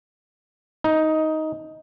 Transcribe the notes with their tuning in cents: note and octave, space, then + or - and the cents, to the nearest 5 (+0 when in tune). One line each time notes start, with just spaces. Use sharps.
D#4 +10